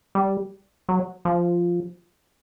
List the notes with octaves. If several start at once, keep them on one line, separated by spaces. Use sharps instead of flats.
G3
F#3
F3